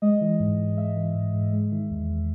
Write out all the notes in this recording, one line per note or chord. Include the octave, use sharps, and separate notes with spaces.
G#3 D#5
E3
G#2
G#2
G#3 E5
E3
G#2
G#2
G#3
D#3
E2
E2